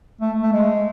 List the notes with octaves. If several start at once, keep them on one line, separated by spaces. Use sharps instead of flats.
A3
A3
G#3